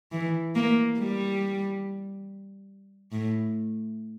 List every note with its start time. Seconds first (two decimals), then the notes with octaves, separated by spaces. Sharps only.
0.12 E3
0.55 A#3
0.98 G3
3.12 A2